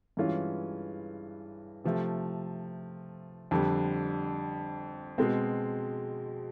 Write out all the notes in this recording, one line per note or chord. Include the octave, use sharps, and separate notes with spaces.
G2 E3 G#3 C#4 F4
C3 F3 A3
F2 D3 G3
B2 G#3 C4